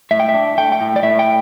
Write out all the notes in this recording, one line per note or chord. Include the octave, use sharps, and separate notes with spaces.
A2 E5
G5
E5
D4
A3 G5
G5
A2
D5
A2 E5
G5